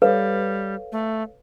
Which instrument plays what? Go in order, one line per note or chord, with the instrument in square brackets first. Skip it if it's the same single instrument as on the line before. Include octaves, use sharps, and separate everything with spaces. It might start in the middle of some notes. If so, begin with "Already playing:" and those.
[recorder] G3 [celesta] A4 C#5 F5 [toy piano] B4
[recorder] A3